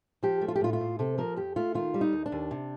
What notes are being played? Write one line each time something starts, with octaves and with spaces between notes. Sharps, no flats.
F3 G4
A3
F4
G4
A2 F4
F4
A2
C3 A4
F3 A#4
F2 G4
A3 F4
D#3 F4
G3
D#4
D#2
D4
D#2
C3